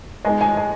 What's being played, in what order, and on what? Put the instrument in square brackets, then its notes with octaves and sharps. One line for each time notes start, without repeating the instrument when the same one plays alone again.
[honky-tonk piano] G#3 B3 D#4 [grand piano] G#5
[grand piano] G#5
G#5